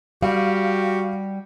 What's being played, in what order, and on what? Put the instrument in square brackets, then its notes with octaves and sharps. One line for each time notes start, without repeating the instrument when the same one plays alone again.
[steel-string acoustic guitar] G3 [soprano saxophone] F#4 [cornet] G4 [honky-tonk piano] F5